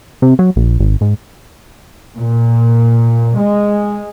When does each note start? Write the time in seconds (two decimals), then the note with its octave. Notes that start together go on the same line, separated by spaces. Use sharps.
0.22 C3
0.39 F#3
0.56 A#1
0.79 G#1
1.01 G#2
2.17 A#2
3.38 G#3